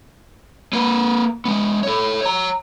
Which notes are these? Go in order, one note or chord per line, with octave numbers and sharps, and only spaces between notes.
A#3 B4
G#3 B3
A4 C#5
C#5 A#5